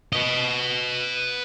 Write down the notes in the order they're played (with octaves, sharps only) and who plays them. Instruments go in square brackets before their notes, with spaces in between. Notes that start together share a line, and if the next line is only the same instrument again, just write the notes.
[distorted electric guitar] B4 D#5